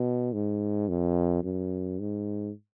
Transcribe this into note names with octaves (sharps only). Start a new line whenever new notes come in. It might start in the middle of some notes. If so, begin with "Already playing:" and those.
Already playing: B2
G#2
F2
F#2
G#2